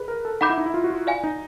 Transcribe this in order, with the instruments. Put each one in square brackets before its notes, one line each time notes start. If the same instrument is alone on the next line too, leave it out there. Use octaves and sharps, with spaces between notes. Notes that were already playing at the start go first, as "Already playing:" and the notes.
Already playing: [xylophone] G#4 [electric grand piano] B4
[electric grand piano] A#4
A4
[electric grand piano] D#4 [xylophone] F#5 B5 D6 G6
[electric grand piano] E4
D#4
E4
F4
F#4
F4
[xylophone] D5 F5 G#5
[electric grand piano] D#4